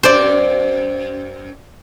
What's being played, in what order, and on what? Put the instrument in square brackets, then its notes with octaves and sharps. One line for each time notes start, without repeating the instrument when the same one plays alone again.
[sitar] F#2 C4 [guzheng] C5 D5